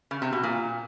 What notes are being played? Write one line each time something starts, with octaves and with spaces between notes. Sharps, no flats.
C#3
C3
B2
A#2